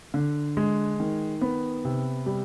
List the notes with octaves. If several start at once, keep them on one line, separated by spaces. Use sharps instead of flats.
D3
G#3
D#3
B3
C3
G3